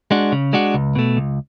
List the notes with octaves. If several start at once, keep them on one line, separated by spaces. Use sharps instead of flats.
G#3 D4 F#4
C#3
G#3 D4 F#4
C#2
B2 A3
C#2